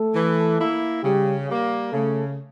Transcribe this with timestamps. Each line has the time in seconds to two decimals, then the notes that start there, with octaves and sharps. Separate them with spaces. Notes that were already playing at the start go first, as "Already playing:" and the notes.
Already playing: A3 A4
0.14 E3
0.59 A#3 E4
1.03 C#3 G3 G4
1.48 G3 A#3
1.92 C#3 A3 A4